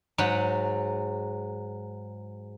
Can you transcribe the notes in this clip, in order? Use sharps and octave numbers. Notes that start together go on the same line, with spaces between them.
G#2 F#3 F#5